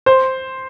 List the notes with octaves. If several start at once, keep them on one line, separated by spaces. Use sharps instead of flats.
C5